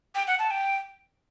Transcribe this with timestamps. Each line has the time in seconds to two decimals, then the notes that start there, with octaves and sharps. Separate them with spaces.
0.15 G5
0.27 F#5
0.39 A5
0.51 G5